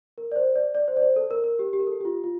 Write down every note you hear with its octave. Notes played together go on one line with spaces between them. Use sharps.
A#4
D5
C5
D5
D5
C5
D5
C5
A4
A#4
A#4
G4
G4
A#4
A4
G4
F4
F4